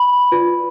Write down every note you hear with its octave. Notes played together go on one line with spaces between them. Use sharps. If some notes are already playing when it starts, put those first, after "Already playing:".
Already playing: B5
F4 B4 D5